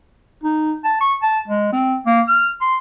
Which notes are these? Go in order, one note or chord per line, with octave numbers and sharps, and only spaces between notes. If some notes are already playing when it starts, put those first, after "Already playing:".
D#4
A5
C#6
A5
G#3
C4
A#3
F6
C6